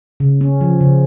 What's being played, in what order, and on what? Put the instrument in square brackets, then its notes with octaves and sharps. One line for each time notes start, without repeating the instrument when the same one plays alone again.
[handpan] C#3
C#4
F3
C#3